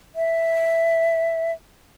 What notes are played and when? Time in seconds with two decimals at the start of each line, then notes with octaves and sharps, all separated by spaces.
0.15 E5